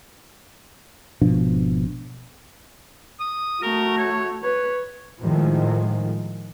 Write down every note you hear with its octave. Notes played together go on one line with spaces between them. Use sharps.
G#1 B2 F3 D4
D#6
A3 F#4 A#4
C#5
B4 C#5
A2 D#3 F3 G#3